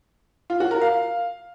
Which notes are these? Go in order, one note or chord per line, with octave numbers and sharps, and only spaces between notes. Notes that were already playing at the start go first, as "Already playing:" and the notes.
F4
F#4
A#4
F5